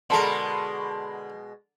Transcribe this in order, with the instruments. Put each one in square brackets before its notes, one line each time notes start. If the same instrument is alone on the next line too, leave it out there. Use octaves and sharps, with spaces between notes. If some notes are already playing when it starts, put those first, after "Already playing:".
[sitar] B2 G#3 [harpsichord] D3 A#4 [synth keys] A5 B5 C6